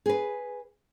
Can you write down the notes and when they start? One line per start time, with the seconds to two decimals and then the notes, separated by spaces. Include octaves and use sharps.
0.06 G#4 B4